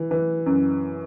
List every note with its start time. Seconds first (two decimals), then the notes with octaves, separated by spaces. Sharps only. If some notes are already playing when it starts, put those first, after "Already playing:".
Already playing: E3
0.11 E3
0.46 F#2